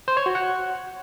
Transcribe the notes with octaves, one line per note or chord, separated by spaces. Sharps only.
C5
C#5
F#4
F#5